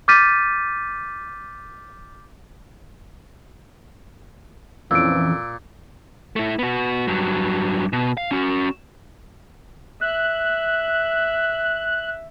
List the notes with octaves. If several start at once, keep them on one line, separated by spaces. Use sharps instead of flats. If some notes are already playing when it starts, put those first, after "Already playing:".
D6 F6 G6 A6 B6 D#7
F2 A#2 E3 C#4 E6 D7
A3 E4
B3 F#4
G2 F#3
B2
F5
C#4 F#4
E5 F#6